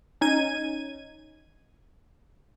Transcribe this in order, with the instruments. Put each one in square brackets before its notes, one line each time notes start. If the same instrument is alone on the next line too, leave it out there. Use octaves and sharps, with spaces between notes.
[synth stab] C#4 D#4 G#6 D#7